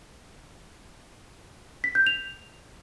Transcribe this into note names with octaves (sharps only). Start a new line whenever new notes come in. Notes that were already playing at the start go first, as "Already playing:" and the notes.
B6
G6
F7